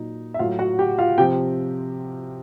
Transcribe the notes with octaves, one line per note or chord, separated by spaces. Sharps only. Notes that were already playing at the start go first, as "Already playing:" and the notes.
Already playing: A#2 F#3 D#4
E5
A2 F#3 F4 F5
F#4 F#5
G4 G5
F4 F5
C3 F3 G4 G5